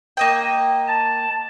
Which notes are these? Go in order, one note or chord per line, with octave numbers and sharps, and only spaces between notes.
A#3 D#5 G5
A5